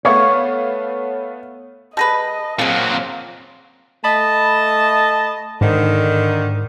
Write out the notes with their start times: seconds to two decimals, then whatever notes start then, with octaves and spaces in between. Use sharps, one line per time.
0.05 A3 B3 C#5 F5
1.97 G3 G#4 B4 D#5 A5 A#6
2.59 A#2 F#3 A#3 C4 G#4 F5
4.04 A3 D#5 A5 B5
5.61 G#2 D3 D#3